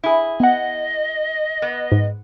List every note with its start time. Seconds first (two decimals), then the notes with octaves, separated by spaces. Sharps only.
0.04 E4 G#4
0.40 B3 D#5 F#5
1.62 B3
1.92 G#2